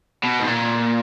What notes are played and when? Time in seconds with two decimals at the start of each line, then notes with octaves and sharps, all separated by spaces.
0.23 B2
0.40 G#2
0.47 A#2